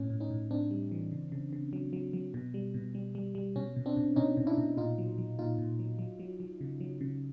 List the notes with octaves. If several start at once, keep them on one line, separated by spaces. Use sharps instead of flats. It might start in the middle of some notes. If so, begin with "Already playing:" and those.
Already playing: A2 C#4
A2
C#4 D#4
A2
A2 C4 D4
G3
E3
C#3
C#3
C#3
F#3
F#3
F#3
B2
G3
B2
G3
G3
G3
B2 C#4
B2
C4 D4
B2
B2 C#4 D#4
B2
D4 E4
B2
A#2 D#4 F4
F#3
F#3
A#2 D#4 F4
A#2
F#3
F#3
F#3
F#3
C#3
F#3
C#3